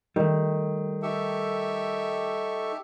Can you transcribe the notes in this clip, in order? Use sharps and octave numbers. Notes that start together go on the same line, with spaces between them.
D#3 G3 A3
D#4 G4 A4 E5 C#6